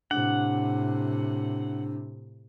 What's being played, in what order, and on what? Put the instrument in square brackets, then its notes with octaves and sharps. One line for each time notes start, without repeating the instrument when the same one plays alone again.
[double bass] A2 C3 [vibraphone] D4 [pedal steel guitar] F#5